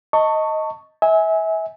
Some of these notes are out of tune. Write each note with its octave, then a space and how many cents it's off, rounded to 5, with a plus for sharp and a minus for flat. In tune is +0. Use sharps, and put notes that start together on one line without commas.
D#5 +10 A5 +25 C#6 +0
E5 -30 G#5 +0